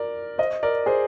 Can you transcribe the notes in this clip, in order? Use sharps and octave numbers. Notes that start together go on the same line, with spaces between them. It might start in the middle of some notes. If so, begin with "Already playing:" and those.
Already playing: A#4 D5
C5 D#5
A#4 D5
G#4 C5